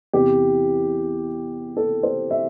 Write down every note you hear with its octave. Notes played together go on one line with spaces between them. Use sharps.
E2 C3 E3 G4
A4
C5
E5